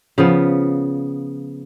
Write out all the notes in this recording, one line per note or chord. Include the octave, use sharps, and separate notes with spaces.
C#3 F3 B3